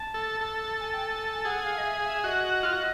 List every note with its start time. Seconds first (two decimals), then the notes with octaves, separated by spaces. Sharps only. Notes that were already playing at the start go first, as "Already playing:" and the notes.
Already playing: A5
0.14 A4
0.41 A4
0.67 A5
0.80 G#5
0.93 G5
1.07 G#5
1.45 G#4 F#5
1.64 F5
1.78 D#5
1.84 E5
2.04 E5
2.24 F#4 D#5
2.63 F4
2.73 F#4